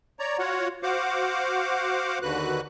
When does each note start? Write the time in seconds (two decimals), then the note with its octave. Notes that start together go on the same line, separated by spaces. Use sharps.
0.19 C#5 D5 A#5
0.38 F4 F#4 C#5 F#5
0.83 F#4 C5 F5 F#5 D6
2.22 D#2 D3 F#4 B4 F#6